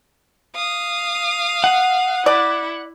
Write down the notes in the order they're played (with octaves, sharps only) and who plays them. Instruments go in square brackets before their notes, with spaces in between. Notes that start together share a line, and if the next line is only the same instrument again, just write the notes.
[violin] F5 D#6
[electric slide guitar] F#5
[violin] E4 [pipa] D5